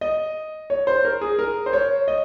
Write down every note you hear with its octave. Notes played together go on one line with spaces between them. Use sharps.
D#5
C#5
C5
A#4
G#4
A#4
C5
C#5
D#5